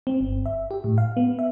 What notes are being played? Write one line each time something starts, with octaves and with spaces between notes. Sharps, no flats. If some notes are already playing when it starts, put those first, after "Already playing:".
C4
G1
E5
G4
A2
F5
B3
E5